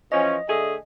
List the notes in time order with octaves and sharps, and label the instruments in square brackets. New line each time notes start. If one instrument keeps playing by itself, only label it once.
[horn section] E3 F3 C#4 [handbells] D#5
[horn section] D3 A3 G#4